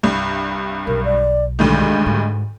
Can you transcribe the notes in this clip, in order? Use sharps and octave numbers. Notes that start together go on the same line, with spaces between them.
C2 G2
B1 A#4
D5
D2 G2 D#3 G#3
G#2